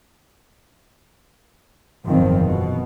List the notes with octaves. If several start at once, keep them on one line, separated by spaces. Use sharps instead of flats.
F#1 E2 G#2 D#3 F3 C4
B2